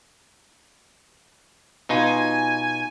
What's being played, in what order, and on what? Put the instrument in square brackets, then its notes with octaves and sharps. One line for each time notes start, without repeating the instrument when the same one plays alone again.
[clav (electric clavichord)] B2 D#4 F4 [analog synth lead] G#5